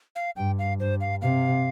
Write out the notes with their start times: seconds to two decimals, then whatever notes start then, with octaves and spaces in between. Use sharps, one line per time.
0.16 F5
0.36 G2 G5
0.59 F5
0.80 G2 C5
1.01 F5
1.22 C3 F5